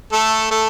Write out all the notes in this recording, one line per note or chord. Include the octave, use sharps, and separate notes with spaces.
A3 A4
A3 A4